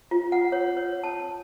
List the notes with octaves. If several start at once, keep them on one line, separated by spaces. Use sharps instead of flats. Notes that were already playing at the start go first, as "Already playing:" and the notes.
F4
F#5
C#5
C#5
A5